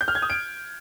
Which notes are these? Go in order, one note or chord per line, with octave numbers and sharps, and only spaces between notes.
G6
F6
G#6
D#6
D7